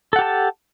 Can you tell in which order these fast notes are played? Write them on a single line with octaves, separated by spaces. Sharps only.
A4 F#5 G4 A5